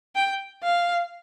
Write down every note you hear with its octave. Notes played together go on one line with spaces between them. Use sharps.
G5
F5